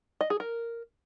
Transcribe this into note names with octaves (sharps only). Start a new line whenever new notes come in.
D#5
G#4
A#4